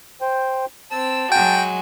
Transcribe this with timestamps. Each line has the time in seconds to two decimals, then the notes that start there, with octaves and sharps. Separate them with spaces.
0.21 C5 G5
0.91 C4 A5 E6
1.32 F#3 G#3 F#4 G5